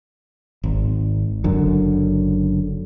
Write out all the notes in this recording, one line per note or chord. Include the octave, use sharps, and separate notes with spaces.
G#1
F#1 F#2 D3